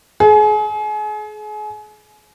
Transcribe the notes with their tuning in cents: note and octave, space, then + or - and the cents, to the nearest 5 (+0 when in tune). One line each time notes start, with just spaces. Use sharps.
G#4 +35